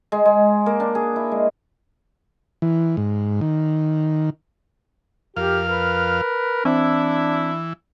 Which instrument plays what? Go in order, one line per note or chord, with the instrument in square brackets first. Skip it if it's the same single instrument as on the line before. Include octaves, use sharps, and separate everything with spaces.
[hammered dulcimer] G#3
G#3
A#3
D4
G#4
E4
G#3
[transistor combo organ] E3
G#2
D#3
[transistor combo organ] F2 F5 [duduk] G4 [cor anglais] A#4
[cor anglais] A#4 [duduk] B4
[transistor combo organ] E3 [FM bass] C4 [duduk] D4 [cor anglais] E4